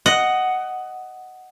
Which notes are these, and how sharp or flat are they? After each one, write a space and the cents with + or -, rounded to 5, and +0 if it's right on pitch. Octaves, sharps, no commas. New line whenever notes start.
D#5 +0 F#5 +10